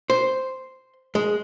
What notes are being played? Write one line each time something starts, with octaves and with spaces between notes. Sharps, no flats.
C5
G#3